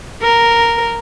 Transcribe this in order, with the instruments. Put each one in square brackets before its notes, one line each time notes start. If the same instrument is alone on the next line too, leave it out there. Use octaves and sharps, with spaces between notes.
[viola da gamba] A#4